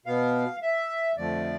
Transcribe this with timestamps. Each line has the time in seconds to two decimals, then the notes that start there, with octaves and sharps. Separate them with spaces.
0.06 B2 B3 F5
0.62 E5
1.17 F2 D3 F3 A3 D5